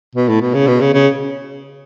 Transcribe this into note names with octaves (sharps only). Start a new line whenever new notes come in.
B2
A2
B2
C#3
B2
C#3
C#3